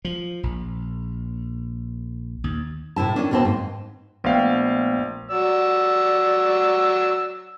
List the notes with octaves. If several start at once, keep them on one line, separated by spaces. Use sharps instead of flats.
F3
A#1
D#2
A2 C3 E4 A5
D#3 F3 C#4 D4
D#2 B2 C4 D#5 A5
G#2
A#1 A3 B3 F5 G5
F#3 D5 E6